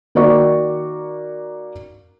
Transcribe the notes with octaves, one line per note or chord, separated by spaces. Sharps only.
D#3 A#3 F#4 D5 C#6